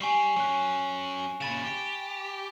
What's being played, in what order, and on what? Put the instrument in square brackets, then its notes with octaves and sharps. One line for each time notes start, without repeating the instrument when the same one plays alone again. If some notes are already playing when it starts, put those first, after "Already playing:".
[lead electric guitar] G3 G4 [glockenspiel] G#5 C#6 C7
[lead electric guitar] F#3 C#4 [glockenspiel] C#6 F#6
[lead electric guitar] A#2 C#3 [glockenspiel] B5 A6 E7
[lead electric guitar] G4